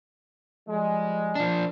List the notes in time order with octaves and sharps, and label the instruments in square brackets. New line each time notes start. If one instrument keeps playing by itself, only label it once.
[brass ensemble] F3 G3 G#3
[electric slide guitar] F3 D4